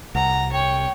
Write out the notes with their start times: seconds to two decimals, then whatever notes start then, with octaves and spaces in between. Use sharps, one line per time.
0.15 C2 F#5 A#5
0.52 C#5 G5